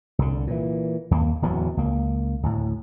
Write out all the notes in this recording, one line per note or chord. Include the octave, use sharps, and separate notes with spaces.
C2 D3
A#2 E3
D#2 A3 A#3
D1 E2 E3 F#3
C#2 A#3
D2 A2